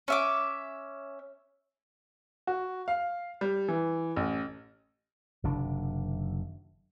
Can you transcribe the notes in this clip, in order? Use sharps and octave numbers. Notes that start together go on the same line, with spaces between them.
C#4 E5 D6
F#4
F5
G3
E3
A1
F#1 C3 D#3 D4